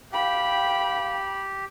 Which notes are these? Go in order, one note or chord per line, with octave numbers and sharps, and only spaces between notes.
G4 F5 G5 B5